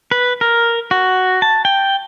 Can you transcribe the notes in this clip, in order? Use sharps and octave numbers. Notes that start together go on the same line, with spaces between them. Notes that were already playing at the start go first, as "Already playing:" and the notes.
B4
A#4
F#4
A5
G5